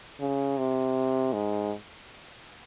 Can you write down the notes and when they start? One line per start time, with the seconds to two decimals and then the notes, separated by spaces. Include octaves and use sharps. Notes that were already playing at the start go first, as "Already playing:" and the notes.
0.20 C#3
0.58 C3
1.33 G#2